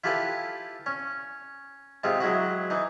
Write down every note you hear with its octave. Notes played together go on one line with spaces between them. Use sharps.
E4 F4 G4 A4 B4 G#5
C#4
C3 G#3 C4 F4
F#3 G#3 E4 F#4
E3 D#4